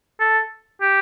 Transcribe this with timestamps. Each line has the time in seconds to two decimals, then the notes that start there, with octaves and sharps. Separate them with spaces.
0.20 A4
0.81 G4